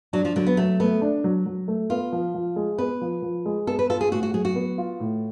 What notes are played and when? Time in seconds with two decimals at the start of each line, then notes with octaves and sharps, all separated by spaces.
0.13 F#3 D4
0.25 F3
0.36 D3 F#3
0.47 B3
0.57 F#3 A3
0.80 A3 B3
1.02 D4
1.24 F#3
1.46 F#3
1.68 A3
1.90 B3 F4
2.13 F3
2.34 F3
2.56 G#3
2.78 B3 B4
3.01 F3
3.22 F3
3.46 G#3
3.67 B3 A4
3.79 B4
3.90 F4 A4
4.01 G#4
4.11 A2 F#4
4.23 F#4
4.34 F#3 G#4
4.45 F#4
4.56 B3
4.78 F4
5.00 A2